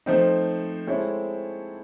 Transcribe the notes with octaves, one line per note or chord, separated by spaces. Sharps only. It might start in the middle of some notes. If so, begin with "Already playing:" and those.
F3 A3 C4 D#4
G#3 C4 E4 A4 C#5